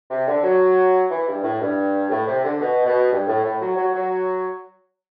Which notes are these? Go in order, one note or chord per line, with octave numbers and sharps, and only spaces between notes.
C3
D3
F#3
E3
G2
A2
G2
A2
C3
D3
B2
B2
G2
A2
A2
F#3
F#3
F#3